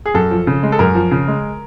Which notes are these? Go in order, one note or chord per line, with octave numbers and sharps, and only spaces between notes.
G#4
F#2 A4
F3
C#3
G#3
A4
F#2 A#4
F3
C#3
G#3